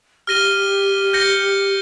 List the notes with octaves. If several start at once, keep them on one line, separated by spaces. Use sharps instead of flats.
G4 F6 A#6 D#7 G7
G6 A#6 C#7 G7